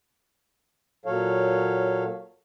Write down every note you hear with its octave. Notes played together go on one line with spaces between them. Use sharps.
A#2 F#3 A4 C#5 F5